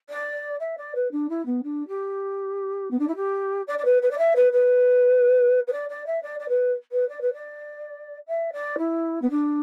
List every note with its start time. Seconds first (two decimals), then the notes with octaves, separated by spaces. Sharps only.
0.09 D5
0.60 E5
0.77 D5
0.95 B4
1.11 D4
1.29 E4
1.45 B3
1.63 D4
1.87 G4
2.90 B3
2.99 D4
3.07 E4
3.15 G4
3.67 D5
3.78 D5
3.84 B4
4.02 B4
4.10 D5
4.17 E5
4.35 B4
4.52 B4
5.67 B4
5.72 D5
5.89 D5
6.06 E5
6.22 D5
6.39 D5
6.48 B4
6.91 B4
7.08 D5
7.21 B4
7.33 D5
8.27 E5
8.52 D5
8.78 E4
9.21 B3
9.30 D4